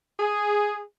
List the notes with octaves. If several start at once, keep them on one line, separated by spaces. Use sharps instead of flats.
G#4